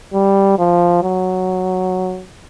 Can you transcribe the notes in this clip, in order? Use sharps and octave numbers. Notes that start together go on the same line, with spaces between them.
G3
F3
F#3